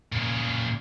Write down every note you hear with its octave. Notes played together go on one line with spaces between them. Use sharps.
A#2 C#3